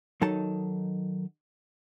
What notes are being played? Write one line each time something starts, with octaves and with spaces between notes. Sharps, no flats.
D#3 F#3 D#4 A4 A5